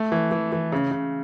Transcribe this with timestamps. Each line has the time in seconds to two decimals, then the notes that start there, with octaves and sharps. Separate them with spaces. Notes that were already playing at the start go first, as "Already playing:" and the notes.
Already playing: A3
0.12 E3
0.32 E3
0.52 E3
0.72 C#3
0.92 C#3